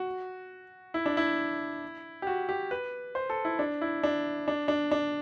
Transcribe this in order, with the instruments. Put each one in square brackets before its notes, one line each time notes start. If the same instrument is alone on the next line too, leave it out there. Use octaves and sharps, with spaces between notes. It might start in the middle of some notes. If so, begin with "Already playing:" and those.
Already playing: [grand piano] F#4
E4
D4
E4
G4
F#4
G4
B4
C5
A4
E4
D4
E4
D4
D4
D4
D4